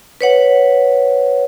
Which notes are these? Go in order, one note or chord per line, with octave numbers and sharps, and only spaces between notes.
B4 C#5 F#5